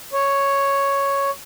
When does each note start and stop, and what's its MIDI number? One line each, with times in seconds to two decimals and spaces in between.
0.13 1.30 73